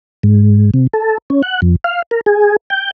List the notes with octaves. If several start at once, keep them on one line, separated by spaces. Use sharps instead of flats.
G#2
C3
A4
C#4
F#5
F2
F5
A#4
G#4
G5